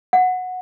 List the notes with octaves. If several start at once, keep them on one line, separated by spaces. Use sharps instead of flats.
F#5